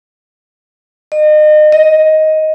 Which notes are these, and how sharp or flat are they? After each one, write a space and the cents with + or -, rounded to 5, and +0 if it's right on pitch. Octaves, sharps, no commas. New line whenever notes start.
D#5 -35
D#5 +10